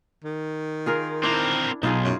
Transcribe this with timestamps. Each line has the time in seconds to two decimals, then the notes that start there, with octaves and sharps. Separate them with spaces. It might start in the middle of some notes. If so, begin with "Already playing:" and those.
0.24 D#3
0.86 F4 G#4 A#4
1.23 C4 D4 E4 A#4
1.83 B1 D#4 F4 G#4
2.04 F#2